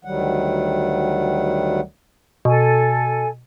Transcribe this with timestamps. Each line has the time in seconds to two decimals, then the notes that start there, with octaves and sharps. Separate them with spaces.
0.05 D2 D#3 F#3 G3 F#5
2.45 B2 A4 G#5